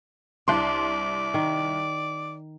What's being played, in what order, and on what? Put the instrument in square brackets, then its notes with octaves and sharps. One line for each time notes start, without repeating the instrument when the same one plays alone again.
[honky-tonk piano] C2 C6 [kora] D4 [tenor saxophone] D5
[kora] D#3